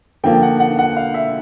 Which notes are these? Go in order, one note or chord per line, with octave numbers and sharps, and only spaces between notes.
D3 F3 A#3 G5
F#5
F#5
F#5
F5
E5